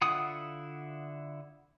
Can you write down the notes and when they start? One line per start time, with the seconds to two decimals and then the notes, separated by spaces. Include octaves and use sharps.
0.02 D3 E4 F4 F#5 D#6